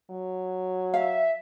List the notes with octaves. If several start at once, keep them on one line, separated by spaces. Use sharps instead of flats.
F#3
E5 F5